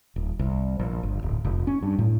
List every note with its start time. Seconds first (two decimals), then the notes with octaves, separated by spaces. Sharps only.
0.16 D#1
0.39 C2
0.79 A#1
1.03 G1
1.23 D1
1.45 F1
1.67 C#4
1.83 G2
1.99 A2